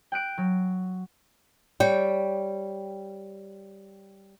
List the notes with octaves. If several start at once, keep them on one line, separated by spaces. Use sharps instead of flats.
G5 F#6 D7
F#3
G3 C#5 G5